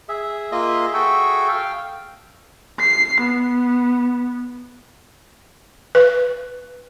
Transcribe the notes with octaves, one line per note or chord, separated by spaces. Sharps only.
G#4 E5
A#3 F4 D#5
F#4 A4 G5
F5 G5
C7
B3
B4